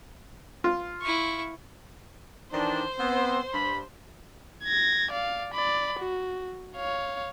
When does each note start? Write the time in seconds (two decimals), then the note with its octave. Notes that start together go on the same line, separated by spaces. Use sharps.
0.64 F4
1.02 E4 C#6
2.52 D#3 E3 D4 C5
2.99 B3 C4
3.54 G2 B5
4.64 G#6 A#6
5.11 D5 F5
5.54 D5 B5
5.99 F#4
6.76 C#5 F5